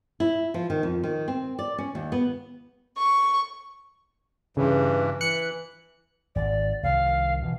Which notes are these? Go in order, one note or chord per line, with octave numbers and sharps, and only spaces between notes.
E4
F3
D#3
F2
D#3
C4
D5
C#4
D#2
B3
C#6
G2 C#3 E3
E3 F#6 C#7
G#1 D5
C2 D#3 F5
B2 E3